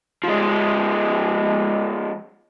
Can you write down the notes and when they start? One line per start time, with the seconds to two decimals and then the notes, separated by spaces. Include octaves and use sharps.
0.24 F3 G#3